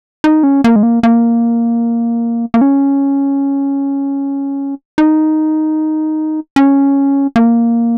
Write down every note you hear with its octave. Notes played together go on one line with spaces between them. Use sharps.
D#4
C#4
A#3
G#3
A#3
A#3
A#3
C#4
D#4
C#4
A#3